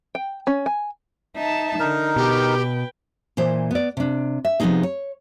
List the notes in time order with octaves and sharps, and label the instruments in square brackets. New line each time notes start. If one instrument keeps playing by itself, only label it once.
[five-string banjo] G5
C#4
G#5
[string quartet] D#4 E5 A5
[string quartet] D3 [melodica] D#4 A#4
[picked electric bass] B2 [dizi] G4 [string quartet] B4 G5
[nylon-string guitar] A#2 E3 C5
B3 D5
C3 D4
E5
C3 F3 B3 C4 D#4 G#4
C#5